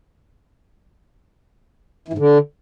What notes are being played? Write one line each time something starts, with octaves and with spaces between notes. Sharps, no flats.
E3
G#2
D3